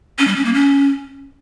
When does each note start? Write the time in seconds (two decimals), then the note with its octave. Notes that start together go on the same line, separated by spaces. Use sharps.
0.19 C#4
0.27 G3
0.36 C#4
0.45 A#3
0.54 C#4